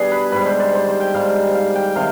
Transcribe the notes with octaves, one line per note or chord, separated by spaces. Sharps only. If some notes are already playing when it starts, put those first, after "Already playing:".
Already playing: B2 G3 D4 G#4
B4
G#2 G3 B4
C5
D5
C5
C5
G5
G#2 G3 F5
F5
G5
C3 D#3 G#3 F5